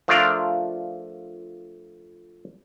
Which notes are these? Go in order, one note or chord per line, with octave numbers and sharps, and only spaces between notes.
F3 A3 D4 F4 A#4 D5